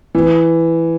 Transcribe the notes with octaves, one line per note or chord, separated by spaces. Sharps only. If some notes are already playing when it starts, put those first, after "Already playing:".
E3